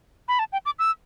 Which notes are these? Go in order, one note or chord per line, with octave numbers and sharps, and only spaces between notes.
B5
A5
G5
D6
E6